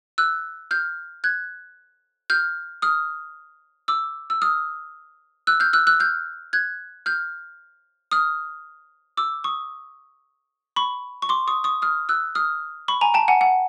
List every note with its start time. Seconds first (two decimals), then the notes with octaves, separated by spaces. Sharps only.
0.18 E6 F#6
0.71 F6 G6
1.24 F#6 G#6
2.30 F6 G6
2.82 D#6 F6
3.88 D6 E6
4.30 E6
4.42 D#6 F6
5.47 E6 F#6
5.60 F6 G6
5.73 E6 F#6
5.87 E6 F#6
6.00 F6 G6
6.53 F#6 G#6
7.06 F6 G6
8.11 D#6 F6
9.17 D6 E6
9.44 C#6 D#6
10.76 B5 C#6
11.22 C#6
11.29 C6 D6
11.48 C#6 D#6
11.64 C#6 D#6
11.82 D#6 F6
12.09 E6 F#6
12.35 D#6 F6
12.88 B5 C#6
13.01 G#5 A#5
13.14 G5 A5
13.28 F#5 G#5
13.41 F#5